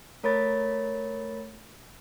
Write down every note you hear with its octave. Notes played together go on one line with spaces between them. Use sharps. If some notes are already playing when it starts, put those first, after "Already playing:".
A3 A#4 C#5 B5 A6